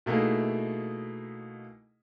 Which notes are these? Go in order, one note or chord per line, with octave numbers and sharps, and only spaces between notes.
B2 A3 A#3 D#4 E4 G#4